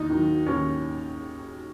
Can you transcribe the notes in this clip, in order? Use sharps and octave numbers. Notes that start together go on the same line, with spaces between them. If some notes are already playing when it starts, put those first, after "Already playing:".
Already playing: D#2 D#4
D#3 F#3
D#2 C#4